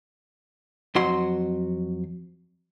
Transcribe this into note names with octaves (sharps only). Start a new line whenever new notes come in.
F2 F#3 F#4 C6